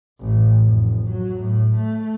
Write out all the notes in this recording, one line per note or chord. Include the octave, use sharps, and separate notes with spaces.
A1
F1
F#3
A2
A3